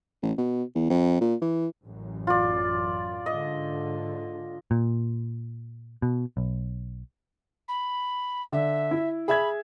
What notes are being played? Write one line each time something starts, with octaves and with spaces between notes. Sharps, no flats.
A1
B2
E2
F2
A#2
E3
A1 F#2
F4 D5
G#2 D3 D#5
A#2
B2
B1
B5
D3 E5
E4
G#4 E5 B5 G#6